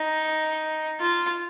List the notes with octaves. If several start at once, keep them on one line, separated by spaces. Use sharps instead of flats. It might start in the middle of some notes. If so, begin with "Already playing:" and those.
Already playing: D#4
F4